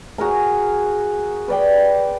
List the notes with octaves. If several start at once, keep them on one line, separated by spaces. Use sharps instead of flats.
F#4 G#4 A#4 A#5
B4 D5 G5